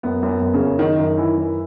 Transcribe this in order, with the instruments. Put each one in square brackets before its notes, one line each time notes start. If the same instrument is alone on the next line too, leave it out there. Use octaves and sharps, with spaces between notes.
[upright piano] F#2 B3
F#2
B3
F#2
C#3 C#4
F#2
D#3 D#4
F#2
D#3 E3 E4
F#2